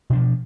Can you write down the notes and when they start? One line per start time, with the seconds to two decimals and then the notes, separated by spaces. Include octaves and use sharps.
0.10 B2
0.13 D4
0.15 F3